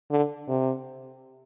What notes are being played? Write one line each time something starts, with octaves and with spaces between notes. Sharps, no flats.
D3
C3